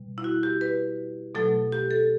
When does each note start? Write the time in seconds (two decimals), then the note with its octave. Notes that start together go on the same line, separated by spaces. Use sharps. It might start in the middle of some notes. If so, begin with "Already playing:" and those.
Already playing: B2 G3
0.18 E4
0.24 F#4
0.43 G4
0.61 B4
1.35 B2 F#3 A3 A4
1.72 G4
1.91 A4